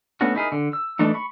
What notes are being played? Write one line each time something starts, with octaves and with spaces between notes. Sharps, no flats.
A3 B3 C#4 D4 F#4
D#4 E4 G#4 A#4
D3
E6
E3 A3 D4 D#4
B5 C#6